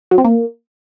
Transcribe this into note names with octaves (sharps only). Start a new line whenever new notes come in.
F#3
C4
A#3